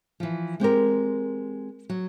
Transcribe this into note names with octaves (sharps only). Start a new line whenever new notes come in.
E3 F3
G#3 C4 G4 A#4
F#3